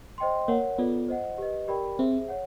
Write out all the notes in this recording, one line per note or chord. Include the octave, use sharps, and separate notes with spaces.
C5 D#5 G5 C6
A#3 A#4 C#5 F#5
B3 F4 A4 D5
C5 D#5 F#5
G4 B4 D#5
G4 A#4 D5 G5 B5
C4 G#4 C5 E5
C#5 F#5